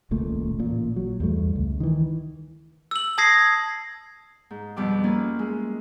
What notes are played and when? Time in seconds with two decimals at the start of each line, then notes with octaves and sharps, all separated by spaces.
0.11 D#1 C#2 A#2 A3
0.59 A1 A#2
0.96 F#3
1.20 E2 G2 A3
1.55 C#2
1.80 D#3 E3
2.91 E6 F#7
3.18 A5 D#6 G#6 A#6 C7
4.50 G#2
4.76 F2 B2 G3 D6
5.04 A#3 C#4 E4 F4
5.39 G#3